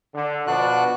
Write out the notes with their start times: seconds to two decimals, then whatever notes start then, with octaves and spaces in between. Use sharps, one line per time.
0.14 D3
0.47 B2 F3 B3 D4 F#4 F#6